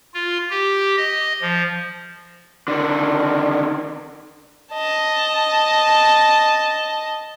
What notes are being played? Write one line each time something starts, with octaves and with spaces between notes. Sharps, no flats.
F4
G4
D#5
F3
D3 D#3
D#5 A5